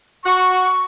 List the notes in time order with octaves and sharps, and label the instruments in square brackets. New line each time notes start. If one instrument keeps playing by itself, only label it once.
[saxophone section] F#4 [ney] C#6